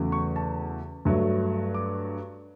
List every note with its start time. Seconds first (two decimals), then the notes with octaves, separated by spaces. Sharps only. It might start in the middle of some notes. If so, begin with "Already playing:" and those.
Already playing: E2 C#3 F#3 A3
0.12 C#6
0.36 A5
1.05 G2 F#3 A3
1.74 D6